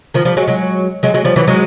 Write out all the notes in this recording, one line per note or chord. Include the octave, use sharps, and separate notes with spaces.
D#3 F3
F3 G3
F#3 G#3
F#3 G#3
F#3 G#3
F#3 G#3
F3 G3
E3 F#3
F#3 G#3